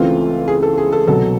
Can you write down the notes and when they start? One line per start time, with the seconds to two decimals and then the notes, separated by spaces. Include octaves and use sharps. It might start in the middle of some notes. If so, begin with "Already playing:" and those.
Already playing: C#2 C#3 E3 A3 C4 F4
0.48 G#4
0.63 A4
0.78 G#4
0.92 A4
1.07 C2 B2 F#3 A4